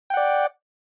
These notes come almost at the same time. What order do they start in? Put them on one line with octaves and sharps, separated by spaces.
G5 F#5 D5